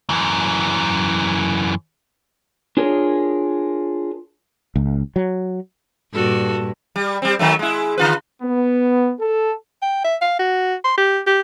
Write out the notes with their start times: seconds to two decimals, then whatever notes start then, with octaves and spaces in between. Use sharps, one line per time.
0.09 F#2 E3
2.77 D4 F4 G#4 A#4 C#5
4.76 C#2
5.16 F#3
6.13 G2 A#2 F#4 A4
6.96 G3
7.22 G3 C4
7.39 D#3 F#3 A3
7.59 G#3 E4
7.98 D3 F4 B4
8.43 B3
9.20 A4
9.82 G5
10.05 E5
10.21 F5
10.39 F#4
10.84 C6
10.98 G4
11.27 G4